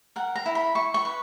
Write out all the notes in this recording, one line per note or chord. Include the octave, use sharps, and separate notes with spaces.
A#4 F#5
A#5
E4
B5
E4 C#6
C#6
B4